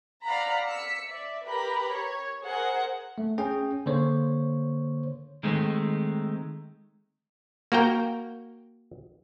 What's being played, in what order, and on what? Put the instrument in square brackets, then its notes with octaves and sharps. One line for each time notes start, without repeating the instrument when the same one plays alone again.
[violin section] D5 F5 F#5 A#5 B5
E6 B6 C#7
D5 E5
G4 A#4 B4 A#5 B5
C#5
G#4 A#4 C5 F#5
[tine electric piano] A3
C#4 G#4 G5
D3 A#3 C5 C#5
[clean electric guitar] D#3 G#3 A3 C4
[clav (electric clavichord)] A#3 F#4 A#4 G5